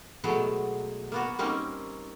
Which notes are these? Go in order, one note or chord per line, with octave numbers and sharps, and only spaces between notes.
B2 F#3 G#3 A3 B3
A#3 B3 F#4
G3 A#3 C4 C#4 D#4